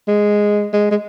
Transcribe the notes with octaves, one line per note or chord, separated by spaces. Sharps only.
G#3
G#3
G#3